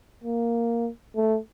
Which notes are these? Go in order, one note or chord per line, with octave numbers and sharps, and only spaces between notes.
A#3
A3